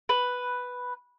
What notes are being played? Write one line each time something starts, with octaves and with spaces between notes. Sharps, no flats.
B4